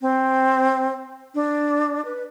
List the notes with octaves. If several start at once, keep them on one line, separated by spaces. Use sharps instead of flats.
C4
D4
B4